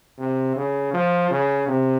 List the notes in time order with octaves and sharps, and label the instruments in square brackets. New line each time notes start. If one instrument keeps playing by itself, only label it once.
[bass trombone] C3
C#3
F3
C#3
C3